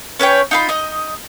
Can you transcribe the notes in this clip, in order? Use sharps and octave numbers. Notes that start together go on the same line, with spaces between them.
C#4 B4 C#5 G5
D#4 F4 B5
D#4 D#5